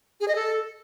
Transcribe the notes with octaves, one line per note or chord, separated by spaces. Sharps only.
G#4
D#5
A4